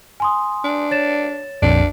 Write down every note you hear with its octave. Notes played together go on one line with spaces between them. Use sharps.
G#5 C6 D#6
D4
C#5 A6 E7
A#1 F2 D4